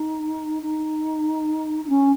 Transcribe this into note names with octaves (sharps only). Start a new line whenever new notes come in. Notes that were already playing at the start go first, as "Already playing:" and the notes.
Already playing: D#4
D#4
D#4
C#4